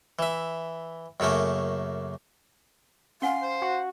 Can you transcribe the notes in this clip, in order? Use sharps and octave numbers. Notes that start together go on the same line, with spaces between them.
E3 E5
F#2 C#3 A3 A#3
C#4 F5 F#5 G#5 C6
C5
F#4